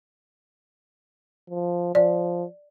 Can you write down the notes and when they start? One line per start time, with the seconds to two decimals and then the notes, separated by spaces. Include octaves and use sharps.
1.50 F3
1.95 F3 D5